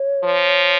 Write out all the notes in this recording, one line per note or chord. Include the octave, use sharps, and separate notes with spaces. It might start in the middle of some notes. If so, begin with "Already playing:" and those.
Already playing: C#5
F3